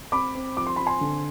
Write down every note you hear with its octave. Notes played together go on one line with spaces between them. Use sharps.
C4 B5 D6
C4
F3 D6
C6
C4 B5
G#5 C6
D3